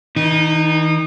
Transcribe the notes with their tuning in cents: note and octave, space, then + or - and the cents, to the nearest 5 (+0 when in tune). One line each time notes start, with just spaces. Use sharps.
D#3 +45 D#4 -25